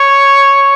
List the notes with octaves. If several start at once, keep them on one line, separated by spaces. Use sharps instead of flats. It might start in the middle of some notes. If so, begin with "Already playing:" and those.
Already playing: C#5